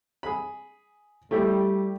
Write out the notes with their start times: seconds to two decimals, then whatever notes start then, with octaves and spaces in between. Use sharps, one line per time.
0.23 G#4 B5
1.31 G3 A3 E4 G4